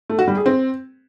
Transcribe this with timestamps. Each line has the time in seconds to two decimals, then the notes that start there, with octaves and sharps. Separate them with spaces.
0.09 A3
0.19 F#4
0.28 G3
0.37 G#4
0.46 C4